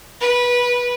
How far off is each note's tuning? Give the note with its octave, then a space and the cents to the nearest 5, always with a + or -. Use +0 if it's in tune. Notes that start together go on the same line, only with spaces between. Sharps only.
B4 -20